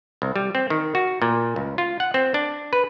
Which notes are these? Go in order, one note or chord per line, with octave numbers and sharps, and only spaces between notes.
C2
G3
C4
D#3
F#4
A#2
C#2
F4
F#5
C4
D4
B4